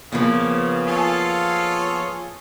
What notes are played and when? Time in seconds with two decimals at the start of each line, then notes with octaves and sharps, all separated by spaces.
0.12 C#3 F3 A#3 B3
0.88 F4 G#4 A4 C#5